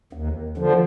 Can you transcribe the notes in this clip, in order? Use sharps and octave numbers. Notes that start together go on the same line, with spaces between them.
D#2
D3 F3